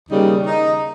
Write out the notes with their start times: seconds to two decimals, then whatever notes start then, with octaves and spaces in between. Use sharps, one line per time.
0.09 D#2 C#3 G3 A#3 D#4
0.47 D#4